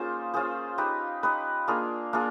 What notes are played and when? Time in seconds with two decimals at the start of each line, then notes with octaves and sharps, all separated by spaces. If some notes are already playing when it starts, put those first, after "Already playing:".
Already playing: A#3 C#4 D#4 F4 G#4 C5
0.34 C#4 F4 G#4 C5
0.78 D#4 G4 B4 D#5
1.23 D#4 G4 B4 D#5
1.68 A#3 D4 F4 G#4
2.13 A#3 D4 F4 G#4